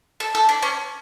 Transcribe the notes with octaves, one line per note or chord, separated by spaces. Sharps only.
A4
A4
D4
C#4